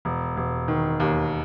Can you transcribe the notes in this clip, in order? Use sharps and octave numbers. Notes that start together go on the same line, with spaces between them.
E1
E1
D#3
D#2